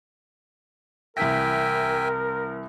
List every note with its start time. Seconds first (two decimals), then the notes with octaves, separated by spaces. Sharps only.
1.17 C2 E3 A#4 E5 G5 G#5 B6